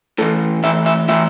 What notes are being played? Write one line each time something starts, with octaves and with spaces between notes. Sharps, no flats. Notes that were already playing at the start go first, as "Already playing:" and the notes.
A2 E3 A4
A2 E3 E5
E5
A2 E3 E5